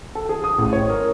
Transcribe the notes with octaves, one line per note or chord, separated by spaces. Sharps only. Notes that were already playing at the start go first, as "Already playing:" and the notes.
A4
G#4
D#6
A1
C#5
A#4